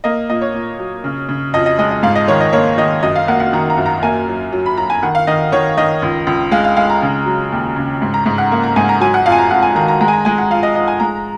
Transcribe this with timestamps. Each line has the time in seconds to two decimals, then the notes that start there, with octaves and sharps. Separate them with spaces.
0.04 A#3 D#5
0.29 A#2 D#5
0.41 C#5
0.54 A#2
0.79 F#3
1.04 C#3
1.29 C#3
1.53 F2 D#5
1.66 D#5
1.78 G#3 D#5
1.91 D#5
2.03 G#2 F5
2.15 D#5
2.28 D#3 C#5
2.40 D#5
2.53 A#3 C#5
2.78 D#3 D#5
3.03 F#2 D#5
3.15 F5
3.28 A#3 F#5
3.40 F#5
3.53 D#3 A#5
3.70 A#5
3.78 F#2
3.86 A#5
4.02 A#3 G#5
4.28 F#3
4.52 F#3
4.66 B5
4.77 F#3 A#5
4.90 G#5
5.03 D#3 F#5
5.15 F5
5.27 D#3 D#5
5.52 D#3 C#5
5.77 D#3 D#5
6.02 C#2
6.27 C#2
6.51 G#3 F5
6.64 F5
6.76 G#3 F5
6.90 A#5
7.02 C#3
7.26 F#3
7.52 D#2
7.76 C#3
8.02 G#2
8.14 A#5
8.26 G#2
8.38 F#5
8.51 A#3
8.63 A#5
8.76 G#2 G#5
8.89 A#5
9.00 F#3 G#5
9.14 F#5
9.26 F2 F5
9.32 G#5
9.38 A#5
9.51 F2 F#5
9.63 G#5
9.75 D#3 A#5
9.88 A#5
10.01 G#3 A#5
10.08 G#5
10.13 A#5
10.25 G#3 G#5
10.38 F#5
10.50 F3 F5
10.63 D#5
10.75 F3 D#5
10.88 G#5
11.00 G#3 A#5